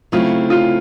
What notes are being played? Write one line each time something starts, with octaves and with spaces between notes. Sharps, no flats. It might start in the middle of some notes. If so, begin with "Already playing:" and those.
C#3 F#3 A3 C4 E4 F4
F4